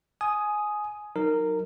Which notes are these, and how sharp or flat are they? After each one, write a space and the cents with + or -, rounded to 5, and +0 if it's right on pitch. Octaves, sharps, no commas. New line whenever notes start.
G#5 +15 D#6 +0
F#3 +0 D#4 +0 A#4 -15